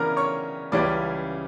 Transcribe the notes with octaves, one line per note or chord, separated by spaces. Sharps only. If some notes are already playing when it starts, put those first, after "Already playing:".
Already playing: C#3 E3 B3 D4 A#4 A#5
C#5 C#6
C#2 C#3 E3 G3 C#4 D5 D6